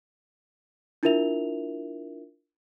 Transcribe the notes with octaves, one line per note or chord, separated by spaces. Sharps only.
D4 E4 F4 A#4 E5 F7